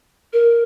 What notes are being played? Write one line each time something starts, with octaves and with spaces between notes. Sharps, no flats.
A#4